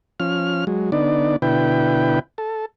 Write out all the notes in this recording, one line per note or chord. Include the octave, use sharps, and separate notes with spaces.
F3 C#4 F6
F#3 G#3
D3 B3 D#4 D5
B2 D3 E4 B4 G5
A4